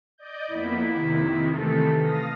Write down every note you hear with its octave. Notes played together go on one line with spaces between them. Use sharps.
D5 D#5 G6
F2 A#3 B3 E4
C3 D#3
E3 A3 A4
F5 D#6 A#6